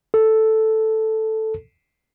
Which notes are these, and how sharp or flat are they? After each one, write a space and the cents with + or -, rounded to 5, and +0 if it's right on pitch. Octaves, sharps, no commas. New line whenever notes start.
A4 +0